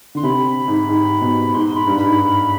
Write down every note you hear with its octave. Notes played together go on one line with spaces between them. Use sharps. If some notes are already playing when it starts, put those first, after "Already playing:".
D3 C6
C3 B5
G#2
G#2
B2
G#2 C6
G#2 B5
G2
B5
G#2